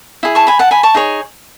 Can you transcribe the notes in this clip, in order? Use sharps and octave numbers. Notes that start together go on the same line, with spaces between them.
E4 G#4
A5 C#6
G#5 B5
F#5 A5
G#5 B5
A5 C#6
D#4 G#4 C#5